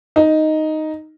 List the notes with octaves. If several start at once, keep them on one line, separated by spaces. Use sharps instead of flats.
D#4